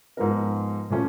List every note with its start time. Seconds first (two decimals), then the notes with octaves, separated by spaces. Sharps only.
0.17 G#2 F3 G#3 B3 A#4
0.90 A#2 F3 A3 C#4